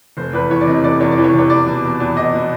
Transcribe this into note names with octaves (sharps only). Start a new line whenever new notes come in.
F1 C5
E2 B4
E3 C#5
D5
C3 D#5
F1 D5
E2 C#5
D5
E3
C#5
C3 C#5
E2 D5
B2
B2
E2
E2 D#5
B2